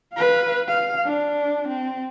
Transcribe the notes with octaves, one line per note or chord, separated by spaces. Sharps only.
B4 F5
F5
D4
C4